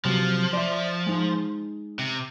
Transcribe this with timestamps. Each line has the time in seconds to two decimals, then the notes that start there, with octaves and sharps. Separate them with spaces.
0.05 C3 F3 F#3
0.53 D5 E5
1.07 G#3 D#4
1.99 C3